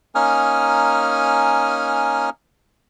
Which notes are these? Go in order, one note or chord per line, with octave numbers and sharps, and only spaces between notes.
A#3 C#4 D#4 G#5 D#6 F6